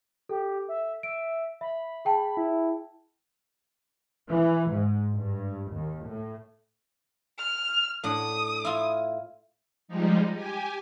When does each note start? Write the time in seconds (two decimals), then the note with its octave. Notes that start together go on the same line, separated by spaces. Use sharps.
0.29 G4 A4
0.69 E5
1.03 E5 D7
1.61 E5 B5
2.05 G#4 G5 A5
2.37 E4
4.28 E3
4.69 G#2
5.13 G2
5.71 D#2
6.05 A2
7.38 F6
8.04 A2 D4 F#5 D#6
8.65 E4 F4 C#5
9.88 F3 G3 G#3 D#4
10.33 G4 G#5